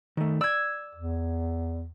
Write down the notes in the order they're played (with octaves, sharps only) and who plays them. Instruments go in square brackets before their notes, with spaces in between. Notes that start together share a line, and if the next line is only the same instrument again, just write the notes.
[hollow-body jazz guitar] D#3 A3
[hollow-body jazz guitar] D5 [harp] E6 G#6
[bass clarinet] E2